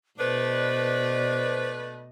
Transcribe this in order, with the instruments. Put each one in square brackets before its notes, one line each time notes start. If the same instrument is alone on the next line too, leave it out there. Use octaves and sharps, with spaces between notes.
[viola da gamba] B2 D5 D#5 [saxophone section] A3 D4 B4 [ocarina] C5